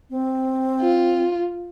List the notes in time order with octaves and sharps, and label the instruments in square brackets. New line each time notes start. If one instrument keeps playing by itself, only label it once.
[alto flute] C4
[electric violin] F4